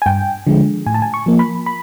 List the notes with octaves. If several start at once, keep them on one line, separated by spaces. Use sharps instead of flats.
G#5
G2 G5
D3 F3 G#3
A2 G#5
A5
G#5
C#6
F3 A#3
B5
B5